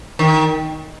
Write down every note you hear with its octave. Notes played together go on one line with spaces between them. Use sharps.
D#3